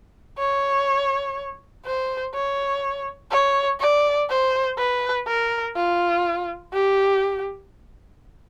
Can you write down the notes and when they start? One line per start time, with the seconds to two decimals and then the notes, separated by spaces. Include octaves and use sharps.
0.39 C#5
1.86 C5
2.34 C#5
3.31 C#5
3.80 D5
4.30 C5
4.78 B4
5.27 A#4
5.77 F4
6.73 G4